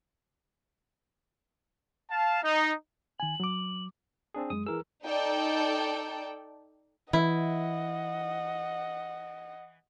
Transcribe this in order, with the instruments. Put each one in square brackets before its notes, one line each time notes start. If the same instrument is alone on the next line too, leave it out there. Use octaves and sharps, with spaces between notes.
[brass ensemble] F5 A5
D#4
[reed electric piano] D#3 G#5 [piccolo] F#7
[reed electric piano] F#3 D6
[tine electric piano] C4 D4 G#4
[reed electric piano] F#2 G#3 [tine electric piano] D#6
[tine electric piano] E3 A#4 E6 [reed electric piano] E4 G#4
[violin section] D#4 A4 D5 G5
[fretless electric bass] E3 [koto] E4 [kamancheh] D#5 F#5